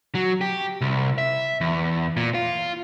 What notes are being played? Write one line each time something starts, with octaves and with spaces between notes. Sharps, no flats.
F#3
G4
C2
E5
E2
A#2
F4